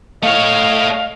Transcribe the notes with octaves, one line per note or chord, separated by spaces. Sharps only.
A3 C#5 D#5 F5